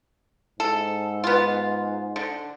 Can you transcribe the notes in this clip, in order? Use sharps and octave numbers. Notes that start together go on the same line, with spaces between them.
G#2 A4
B3 F4
D3